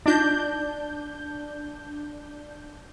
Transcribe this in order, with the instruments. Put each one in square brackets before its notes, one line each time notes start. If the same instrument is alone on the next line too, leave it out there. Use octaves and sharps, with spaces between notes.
[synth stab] D4 G6 [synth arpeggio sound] D#4 F4 A#6